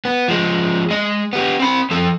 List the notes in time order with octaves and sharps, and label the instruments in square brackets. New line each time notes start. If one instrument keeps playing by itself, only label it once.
[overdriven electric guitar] B3
F3 G#3
G#3 D#5
B3 G4
C4 B5
F3 A4